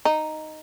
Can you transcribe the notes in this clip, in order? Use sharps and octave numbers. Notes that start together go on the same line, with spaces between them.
D#4